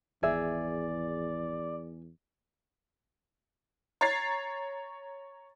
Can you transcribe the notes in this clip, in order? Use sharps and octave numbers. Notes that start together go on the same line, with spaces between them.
G#1 E2 G#4 D5 E5
C#5 A#5 G#6 A6 C7